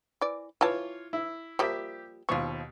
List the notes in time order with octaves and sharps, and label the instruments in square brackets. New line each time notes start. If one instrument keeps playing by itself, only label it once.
[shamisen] E3 D5
[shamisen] E3 A5 [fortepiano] F4 C#5
[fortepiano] E4
[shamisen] F3 G3 A#3 [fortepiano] G4 E5
[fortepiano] D#2 B2 C#6 [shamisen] F3 F4